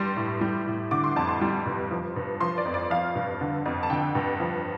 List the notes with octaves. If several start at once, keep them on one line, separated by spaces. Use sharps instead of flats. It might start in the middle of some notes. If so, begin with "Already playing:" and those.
Already playing: G2 G3 C6
A2
G3
A2
D3 D6
C6
F2 A5
C6
G3
G2
F3
G2
F3 C6
D5
F2
D5
F3 F5
G2
D3
F2
A5
D3 G5
G2
F3